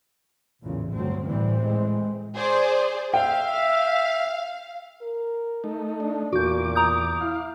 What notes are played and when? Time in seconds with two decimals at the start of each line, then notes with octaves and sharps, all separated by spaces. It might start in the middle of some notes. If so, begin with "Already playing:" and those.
0.62 A1 E2 A#2 C#3
0.92 D2 G2 F#3 C4
1.25 A2 E3 G3 C4
1.60 G#3
2.36 G#4 C5 D5
3.14 E5 F5 G5
5.02 A#4
5.64 A3 D#4
6.00 D4
6.33 E2 A#2 F#4 D6 G6
6.75 A#5 D#6 G6
7.21 E4 F5